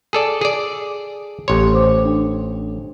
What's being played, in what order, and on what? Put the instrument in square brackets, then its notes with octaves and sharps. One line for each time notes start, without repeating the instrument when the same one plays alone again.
[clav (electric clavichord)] G#4 A4 D5
G#4 D5
[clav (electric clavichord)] A1 C#5 [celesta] G4 C6
[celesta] C5 D6
D4